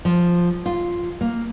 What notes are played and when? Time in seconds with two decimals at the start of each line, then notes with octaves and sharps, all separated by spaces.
0.05 F3
0.66 F4
1.21 A#3